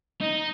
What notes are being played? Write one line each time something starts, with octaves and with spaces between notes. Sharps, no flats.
D#4